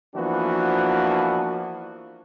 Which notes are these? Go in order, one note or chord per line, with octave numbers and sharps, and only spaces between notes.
E3 F3 A#3 B3 D4 F#4